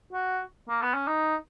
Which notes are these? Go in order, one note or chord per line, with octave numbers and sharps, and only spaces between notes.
F#4
A#3
B3
C#4
D#4